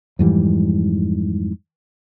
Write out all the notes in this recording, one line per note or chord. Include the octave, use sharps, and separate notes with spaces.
F2 G#2 E3 G3